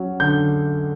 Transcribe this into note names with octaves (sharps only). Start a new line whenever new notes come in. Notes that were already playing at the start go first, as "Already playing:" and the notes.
Already playing: F#3 C#4
D3 G6